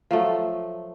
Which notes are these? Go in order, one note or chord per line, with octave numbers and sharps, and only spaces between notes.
F3 F#3 A3